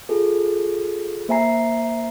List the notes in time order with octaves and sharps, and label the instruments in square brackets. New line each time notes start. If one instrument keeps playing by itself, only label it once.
[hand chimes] F4 G#4 A4
A#3 C5 E5 G#5 A#5 C7